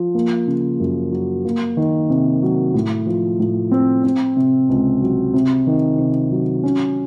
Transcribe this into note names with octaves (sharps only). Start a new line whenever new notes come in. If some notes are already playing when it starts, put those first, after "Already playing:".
Already playing: F3
A#3
C#3
F#2
F#3
A#3
D#3
C3
F#3
A2
F3
A2
C4
C4
C3
C#2
F#3
C3
D#3
C3
F#3
C#4